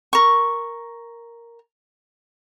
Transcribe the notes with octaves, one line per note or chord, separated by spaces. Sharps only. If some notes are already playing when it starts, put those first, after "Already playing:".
A#4 C#6